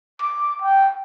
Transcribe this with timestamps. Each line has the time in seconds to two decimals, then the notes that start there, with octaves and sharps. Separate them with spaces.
0.21 D6
0.62 G5